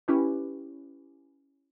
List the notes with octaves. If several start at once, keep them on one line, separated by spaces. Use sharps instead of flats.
C#4 E4 G4 B4